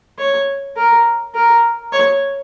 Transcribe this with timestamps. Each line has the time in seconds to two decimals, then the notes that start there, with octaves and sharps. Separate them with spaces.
0.19 C#5
0.77 A#4
1.35 A#4
1.93 C#5